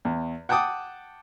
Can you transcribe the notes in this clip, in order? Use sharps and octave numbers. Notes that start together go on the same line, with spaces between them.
E2
F#5 G5 A5 D6 D#6